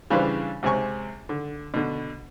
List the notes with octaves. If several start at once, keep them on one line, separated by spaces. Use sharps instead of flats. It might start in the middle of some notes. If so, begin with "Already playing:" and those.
C#3 E3 G3 D4 B4 C5
C#2 C3 C4 G#5 C#6
D3
B2 D3